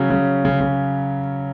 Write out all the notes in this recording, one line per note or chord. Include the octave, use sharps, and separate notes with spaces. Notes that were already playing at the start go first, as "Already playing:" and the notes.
Already playing: C#3 F#3 C#4
C#3
C#3
C#3